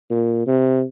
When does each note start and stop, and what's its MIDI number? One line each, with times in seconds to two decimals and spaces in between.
0.10 0.44 46
0.47 0.84 48